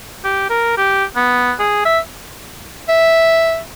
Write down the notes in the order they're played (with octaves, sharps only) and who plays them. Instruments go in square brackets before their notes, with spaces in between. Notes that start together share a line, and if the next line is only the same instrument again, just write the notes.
[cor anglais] G4
A#4
G4
B3
G#4
E5
[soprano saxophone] E5